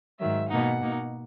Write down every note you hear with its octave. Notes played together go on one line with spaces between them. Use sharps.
G#2 D#3 F#3 E5
B2 A#3 D#4 F#5
B2 A#3 D#4